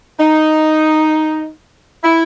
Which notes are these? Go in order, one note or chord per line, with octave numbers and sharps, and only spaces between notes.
D#4
E4